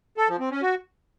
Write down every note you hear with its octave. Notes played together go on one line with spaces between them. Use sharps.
A4
F3
C4
C#4
F#4